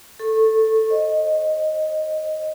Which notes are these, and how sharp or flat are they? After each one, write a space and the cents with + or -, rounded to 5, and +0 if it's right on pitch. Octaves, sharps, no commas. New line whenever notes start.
A4 +5 C#6 -25
C5 +45 D#5 +0